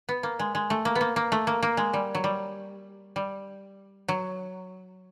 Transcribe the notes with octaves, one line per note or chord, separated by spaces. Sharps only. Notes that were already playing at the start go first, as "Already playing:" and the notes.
B3
A#3
G#3
G#3
A3
A#3
B3
A#3
A#3
A3
A#3
A#3
G#3
G3
F#3
G3
G3
F#3